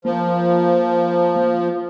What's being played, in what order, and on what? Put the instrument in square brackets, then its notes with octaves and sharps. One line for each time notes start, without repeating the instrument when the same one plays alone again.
[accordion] F3 [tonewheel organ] A#3